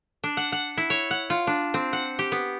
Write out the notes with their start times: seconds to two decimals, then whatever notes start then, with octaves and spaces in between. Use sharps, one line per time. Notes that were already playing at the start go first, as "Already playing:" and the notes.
0.24 D4
0.37 F#5
0.52 F#5
0.77 E4
0.90 C#5
1.11 F#5
1.30 F4
1.47 D4
1.74 C4
1.93 F#5
2.19 G4
2.32 B3